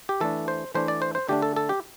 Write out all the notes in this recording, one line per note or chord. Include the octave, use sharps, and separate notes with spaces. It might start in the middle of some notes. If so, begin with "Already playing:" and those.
G4
E3 A3 D4 A4
C5
E3 A3 D4 C5
D5
C5
C5
D3 A3 D4 G4
A4
A4
G4